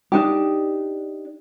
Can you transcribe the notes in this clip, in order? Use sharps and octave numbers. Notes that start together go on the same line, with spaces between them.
D4 D#4 G4